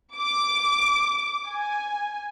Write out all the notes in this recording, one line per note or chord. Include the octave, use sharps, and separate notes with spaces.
D6
G#5